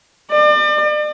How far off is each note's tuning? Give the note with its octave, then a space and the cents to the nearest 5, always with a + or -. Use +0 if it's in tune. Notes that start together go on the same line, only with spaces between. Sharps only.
D5 +40